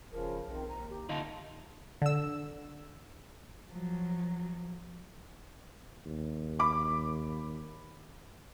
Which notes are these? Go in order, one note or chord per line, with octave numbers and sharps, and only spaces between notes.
E1 C#3 F3 A#4
B1 C3 D#3 A#4
D#2 A#5
G4
D3 D#4 F4 A5
D3 E6
F3 F#3
D#2
B5 D6